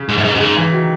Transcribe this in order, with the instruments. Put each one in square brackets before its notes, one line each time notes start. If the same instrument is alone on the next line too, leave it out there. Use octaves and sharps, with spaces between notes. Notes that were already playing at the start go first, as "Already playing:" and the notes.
Already playing: [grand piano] C#3
[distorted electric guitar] G#2
F#2
G#2
F#2
[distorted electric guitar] G#2 [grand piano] C#3
[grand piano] C#3 E3
D#3 F#3